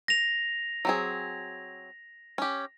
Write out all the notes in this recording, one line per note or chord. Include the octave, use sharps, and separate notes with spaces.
A#6 F7
F#3 C4 G#4
C#4 G4